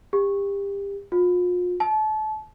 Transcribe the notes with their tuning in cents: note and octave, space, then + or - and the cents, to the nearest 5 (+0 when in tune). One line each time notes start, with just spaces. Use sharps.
G4 +30
F4 +40
A5 -30